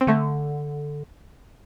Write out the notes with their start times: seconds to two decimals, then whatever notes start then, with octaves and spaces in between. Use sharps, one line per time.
0.01 C4
0.07 D3 A3